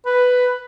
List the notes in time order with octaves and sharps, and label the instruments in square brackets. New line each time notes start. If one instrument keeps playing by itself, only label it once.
[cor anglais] B4